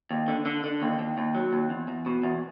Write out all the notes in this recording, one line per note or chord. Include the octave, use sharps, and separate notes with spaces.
D#2
D3
D3
D3
D#2
D#2
D#2
F#3
D#2
E2
E2
B2
E2